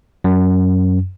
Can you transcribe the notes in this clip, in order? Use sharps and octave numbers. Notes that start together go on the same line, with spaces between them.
F#2